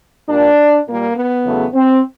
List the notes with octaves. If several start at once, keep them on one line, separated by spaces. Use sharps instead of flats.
A#2 G3 D4
A#2 G3 A#3
B3
E2 C#3 F#3 A3
C4